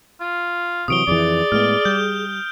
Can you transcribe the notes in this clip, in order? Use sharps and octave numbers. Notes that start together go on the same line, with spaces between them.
F4
C3 E3 F#3 C#6 D#6 D7 G7
F2 E3 G#4 D5
A2 G#3 B3 F6
G3 G6